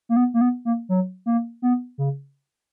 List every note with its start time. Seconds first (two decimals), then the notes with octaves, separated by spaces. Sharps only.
0.09 A#3
0.16 B3
0.34 A#3
0.41 B3
0.65 A#3
0.89 F#3
1.26 A#3
1.62 B3
1.98 C#3